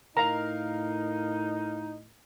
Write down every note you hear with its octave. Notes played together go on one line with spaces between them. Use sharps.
A2 D#4 A#4 F5 A#5